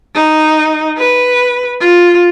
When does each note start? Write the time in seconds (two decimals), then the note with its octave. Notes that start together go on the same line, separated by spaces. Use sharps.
0.15 D#4
0.97 B4
1.80 F4